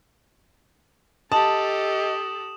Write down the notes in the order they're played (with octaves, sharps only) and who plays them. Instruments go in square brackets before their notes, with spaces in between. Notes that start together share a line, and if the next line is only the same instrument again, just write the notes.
[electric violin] G4 A4 [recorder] D#5 [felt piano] A5 [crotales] D#6 E7 F#7